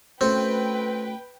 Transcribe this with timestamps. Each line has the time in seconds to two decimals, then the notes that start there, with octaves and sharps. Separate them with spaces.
0.21 A3 C4 C#4 F#4 B4 G5